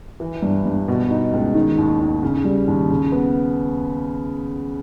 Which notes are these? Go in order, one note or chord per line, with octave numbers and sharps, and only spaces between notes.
E3
G2
G2
B2
D#4
C#2
D#3
D#2
D#2
C#3
G3
D#2
C#3
B3